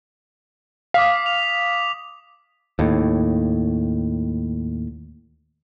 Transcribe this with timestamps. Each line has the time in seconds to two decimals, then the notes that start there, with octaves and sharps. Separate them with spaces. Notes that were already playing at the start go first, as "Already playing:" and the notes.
0.94 F5 D6 D#6 B6
1.26 F7
2.79 D#2 A2